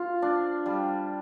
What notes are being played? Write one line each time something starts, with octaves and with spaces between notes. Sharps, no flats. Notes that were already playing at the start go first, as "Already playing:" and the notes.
Already playing: F4
D4
G3